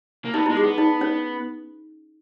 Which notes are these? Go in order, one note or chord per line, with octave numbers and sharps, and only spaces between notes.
A#3
B3 D#4
G#3 E4
G#4
B3
D#4
C#4